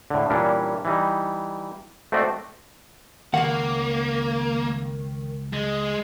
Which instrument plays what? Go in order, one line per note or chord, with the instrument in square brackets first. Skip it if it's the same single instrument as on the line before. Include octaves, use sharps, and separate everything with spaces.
[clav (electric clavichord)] A2 D3
A#2 E3 G3 C#4 D4 A#4
E3 G3 D#4
A3 C4 F#4 C5 D5 D#5
[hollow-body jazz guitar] C#2 F#5 [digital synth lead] D#3 [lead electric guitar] A#3
[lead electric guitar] G#3